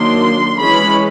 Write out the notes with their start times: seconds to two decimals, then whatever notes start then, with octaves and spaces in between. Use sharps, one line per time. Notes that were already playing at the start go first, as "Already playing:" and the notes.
Already playing: D#3 F#3 A#3 D4 C6
0.58 E3 G#3 C#4 B5